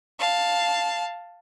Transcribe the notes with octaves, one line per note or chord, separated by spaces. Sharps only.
F5 A5